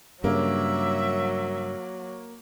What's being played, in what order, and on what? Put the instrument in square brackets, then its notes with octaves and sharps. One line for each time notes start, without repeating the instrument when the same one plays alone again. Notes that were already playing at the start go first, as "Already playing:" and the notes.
[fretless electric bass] G2 C#3 [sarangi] F#3 [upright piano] A#3 [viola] E5